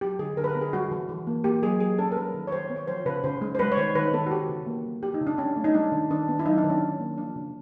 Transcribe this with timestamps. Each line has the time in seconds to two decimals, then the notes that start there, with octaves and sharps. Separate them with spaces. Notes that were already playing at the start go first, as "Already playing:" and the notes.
0.01 F#3 G4
0.19 D3 G#4
0.37 D3 A#4
0.44 B4
0.49 A#4
0.55 B3
0.61 G#4
0.73 G3 F#4
0.91 E3
1.09 E3
1.27 A#3
1.44 A#3 G4
1.63 F#3 G#4
1.80 F#3 G#4
1.98 C#4 A4
2.12 A#4
2.16 G3 B4
2.34 D#3
2.47 C#5
2.52 D#3 C5
2.70 B3
2.76 C#5
2.88 F3 C5
3.06 C#3 B4
3.24 C#3 C5
3.41 G#3
3.55 C5
3.59 G3 B4
3.72 C#5
3.77 D#3 C5
3.95 D#3 B4
4.13 B3 A4
4.27 F#4
4.31 E3 G4
4.49 C#3
4.66 A#3
4.85 G3
5.03 F3 G4
5.14 D#4
5.21 C#3
5.27 D4
5.38 C#4
5.56 A3
5.64 D#4
5.74 G3 D4
5.92 D#3
6.11 D#3 D4
6.28 B3
6.39 E4
6.46 F#3 D#4
6.58 D4
6.64 D#3
6.70 C#4
6.81 D#3
7.00 A#3
7.18 F3 D4
7.36 C#3